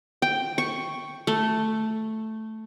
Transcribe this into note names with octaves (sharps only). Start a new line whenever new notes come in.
G5
C#6
A3